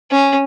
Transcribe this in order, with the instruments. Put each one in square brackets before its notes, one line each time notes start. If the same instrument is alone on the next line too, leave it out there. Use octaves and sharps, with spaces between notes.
[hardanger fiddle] C#4